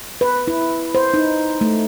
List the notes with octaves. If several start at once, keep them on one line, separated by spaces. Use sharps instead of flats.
B4
E4
C5
D#4
A3